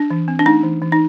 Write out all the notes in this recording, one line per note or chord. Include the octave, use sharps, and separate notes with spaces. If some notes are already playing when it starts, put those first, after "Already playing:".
Already playing: D4
E3
C4
D4
A3 D#4
E3
E3
D#4